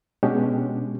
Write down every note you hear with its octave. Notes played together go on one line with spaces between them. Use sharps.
B2 G#3 C#4 D4 G4